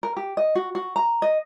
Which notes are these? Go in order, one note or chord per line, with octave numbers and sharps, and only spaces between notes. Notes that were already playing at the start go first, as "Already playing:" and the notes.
A#4
G4
D#5
F#4
F#4
A#5
D#5